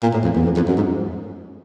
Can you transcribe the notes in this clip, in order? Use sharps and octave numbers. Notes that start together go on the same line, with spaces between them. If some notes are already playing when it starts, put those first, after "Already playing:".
A#2
A2
F2
E2
F2
F2
F#2
G#2